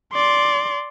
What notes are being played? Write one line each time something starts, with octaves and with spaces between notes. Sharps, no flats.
D5 C6